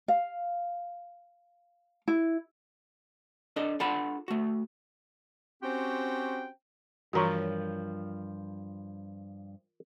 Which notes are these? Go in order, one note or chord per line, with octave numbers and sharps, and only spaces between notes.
F5
E4
D4 A4 D#5
D4 F4 A4 F#5 A5 B5
A3 F#4
C4 C#4 F#4 G4 C5 G5
G2 E3 F3 F4 F#4 A#4 C#5